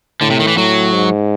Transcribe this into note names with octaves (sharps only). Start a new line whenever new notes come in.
A2 D3
C3
D#3
E3
A2 F#3
G#2